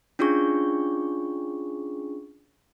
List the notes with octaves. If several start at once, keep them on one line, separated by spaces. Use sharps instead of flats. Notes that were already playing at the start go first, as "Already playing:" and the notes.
C#4 D4 F4 G#4 C#6